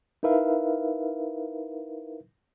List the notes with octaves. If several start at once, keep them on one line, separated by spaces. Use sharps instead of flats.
D#4 E4 A#4 B4 E5 F5